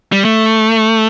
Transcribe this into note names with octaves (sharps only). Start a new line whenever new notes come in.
G3
A3